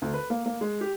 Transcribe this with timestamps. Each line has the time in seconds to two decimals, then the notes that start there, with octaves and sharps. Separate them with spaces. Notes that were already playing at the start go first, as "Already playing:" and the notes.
0.02 D2
0.14 B4
0.30 A#3
0.46 A#3
0.61 G#3
0.81 G4